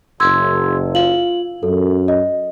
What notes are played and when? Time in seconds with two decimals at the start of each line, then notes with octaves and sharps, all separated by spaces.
0.20 F#1 C6 E6 G#6
0.94 F4 F5 F#7
1.63 F#2 A4
2.08 D#5